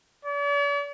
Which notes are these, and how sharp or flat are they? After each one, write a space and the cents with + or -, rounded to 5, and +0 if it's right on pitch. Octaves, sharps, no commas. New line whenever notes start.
D5 -45